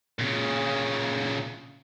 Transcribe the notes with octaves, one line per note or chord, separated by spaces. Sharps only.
A#2 C#3